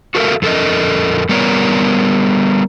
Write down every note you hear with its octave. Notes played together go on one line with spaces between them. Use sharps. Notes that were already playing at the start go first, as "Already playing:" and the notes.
F#4 A4 A#4 C5 E5 F5
F2 A4 A#4 D#5
G3 B3 A#4 C#5 D5